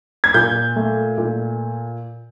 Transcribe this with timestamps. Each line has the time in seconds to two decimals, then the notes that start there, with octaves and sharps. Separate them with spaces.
0.24 G#6
0.34 A#2 G6
0.76 A3
1.18 A#2